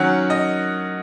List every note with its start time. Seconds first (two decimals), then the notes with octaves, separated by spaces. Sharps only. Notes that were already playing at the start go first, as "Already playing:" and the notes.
Already playing: D#3 F#3 C#4 F#5
0.30 D#5